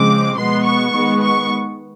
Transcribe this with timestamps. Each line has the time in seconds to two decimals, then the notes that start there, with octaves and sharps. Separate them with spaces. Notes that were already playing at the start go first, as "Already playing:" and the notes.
Already playing: C#3 F3 G#3 C4 D6
0.37 B2 G#3 B3 C6
0.66 C#6
0.94 D#3 G#3 B3
1.22 C#6